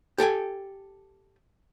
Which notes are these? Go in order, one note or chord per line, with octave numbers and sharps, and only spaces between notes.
G4 A4 G5 G#5